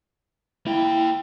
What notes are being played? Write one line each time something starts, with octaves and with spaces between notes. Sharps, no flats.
A#3 E4 G5